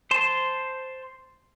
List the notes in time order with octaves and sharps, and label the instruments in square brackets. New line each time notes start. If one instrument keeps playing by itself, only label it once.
[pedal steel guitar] C5 A5 C6